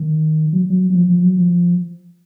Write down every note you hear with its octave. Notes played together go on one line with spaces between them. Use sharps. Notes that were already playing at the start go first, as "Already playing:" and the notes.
Already playing: D#3
F#3
F#3
F#3
F3
F3
F#3
F3